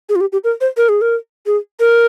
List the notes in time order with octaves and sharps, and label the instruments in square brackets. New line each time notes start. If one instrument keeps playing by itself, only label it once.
[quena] G#4
F4
G4
G4
A#4
C5
A#4
G#4
A#4
G#4
A#4